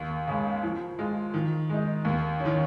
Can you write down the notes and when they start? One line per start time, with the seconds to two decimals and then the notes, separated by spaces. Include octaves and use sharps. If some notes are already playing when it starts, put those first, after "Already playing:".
Already playing: D#2
0.27 C#3 G#3
0.63 F3
0.99 G#3 F4
1.34 D#3
1.69 G#3 D#4
2.05 D#2
2.40 C#4
2.45 D#3